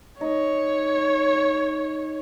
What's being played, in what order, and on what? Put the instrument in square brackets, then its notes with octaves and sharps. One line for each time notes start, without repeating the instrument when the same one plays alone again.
[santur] D#4 [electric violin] C#5